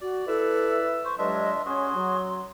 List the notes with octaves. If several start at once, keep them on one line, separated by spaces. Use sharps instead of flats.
F#4 D5
E4 A4 B4 E6
C5 C#6
G2 F#3 G#3 D4 F4 D#5 E5
C#4 F#4 G#4 C6
F#3